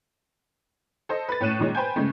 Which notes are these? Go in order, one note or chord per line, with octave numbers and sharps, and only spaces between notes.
A4 C5 D#5
B4 A6
A2 A3 C#4 F#6 D#7 E7
A#2 D#3 G#3 C#4
B4 C5 G5 G#5 G6
C#3 G#3 A3